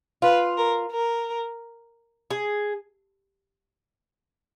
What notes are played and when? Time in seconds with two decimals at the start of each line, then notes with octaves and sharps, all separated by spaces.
0.22 F4 B4
0.57 A#4
0.92 A#4
2.31 G#4